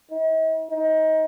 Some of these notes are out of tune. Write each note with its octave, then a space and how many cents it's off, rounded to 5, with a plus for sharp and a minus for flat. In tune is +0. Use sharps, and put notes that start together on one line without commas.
D#4 +45
D#4 +25